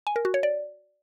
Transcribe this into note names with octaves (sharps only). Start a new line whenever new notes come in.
G#5
A#4
F#4
C#5
D5